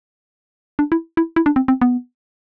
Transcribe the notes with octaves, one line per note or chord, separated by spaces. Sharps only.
D4
E4
E4
E4
D4
C4
C4
B3